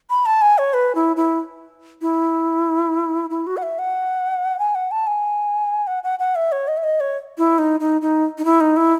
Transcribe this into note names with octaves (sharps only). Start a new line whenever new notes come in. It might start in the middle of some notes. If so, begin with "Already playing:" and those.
B5
A5
G#5
C#5
B4
E4
E4
E4
E4
F#4
F#5
E5
F#5
G#5
F#5
A5
G#5
F#5
F#5
F#5
E5
C#5
D#5
E5
D#5
C#5
E4
D#4
D#4
D#4
D#4
E4
D#4
E4